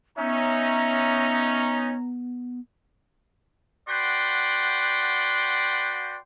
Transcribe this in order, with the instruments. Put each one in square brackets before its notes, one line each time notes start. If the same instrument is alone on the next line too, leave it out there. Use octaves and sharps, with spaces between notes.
[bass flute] B3 [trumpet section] C#4 D#4 [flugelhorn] E5 [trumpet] A#5
[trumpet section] F#4 B4 D5 F#5 G5 C6